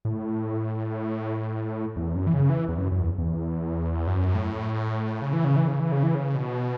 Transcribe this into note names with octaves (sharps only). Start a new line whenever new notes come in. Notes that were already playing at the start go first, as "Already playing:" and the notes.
A2
E2
F#2
E3
C#3
E3
E2
F#2
F#2
E2
E2
F#2
A2
C#3
E3
C#3
E3
C#3
E3
C#3
E3
C#3
B2